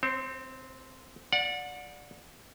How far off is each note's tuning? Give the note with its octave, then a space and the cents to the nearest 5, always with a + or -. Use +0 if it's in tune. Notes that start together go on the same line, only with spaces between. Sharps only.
C4 -10 C5 +45
D5 +0 F#5 -30